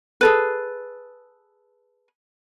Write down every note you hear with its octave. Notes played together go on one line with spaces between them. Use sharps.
G#4 A4 B4